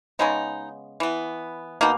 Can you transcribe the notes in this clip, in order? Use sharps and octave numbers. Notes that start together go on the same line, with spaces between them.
C#3 G#3 B3 D#4
E3 B3
B2 A#3 D#4